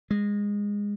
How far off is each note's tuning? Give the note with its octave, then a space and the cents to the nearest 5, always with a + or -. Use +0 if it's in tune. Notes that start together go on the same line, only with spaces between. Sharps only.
G#3 -20